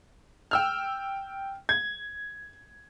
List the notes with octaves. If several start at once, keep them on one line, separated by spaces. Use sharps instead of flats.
G5 E6 F6
G#6